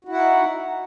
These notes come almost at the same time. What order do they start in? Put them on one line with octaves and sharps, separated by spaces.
F#4 E4 F#5 D#4